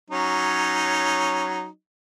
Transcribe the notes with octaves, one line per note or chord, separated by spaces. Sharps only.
F#3 C#4 D#4